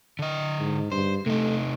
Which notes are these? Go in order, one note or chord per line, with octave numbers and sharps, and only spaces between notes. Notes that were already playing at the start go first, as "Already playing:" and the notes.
D3 D#5
G#2
G2 C5
C3 A3 D#4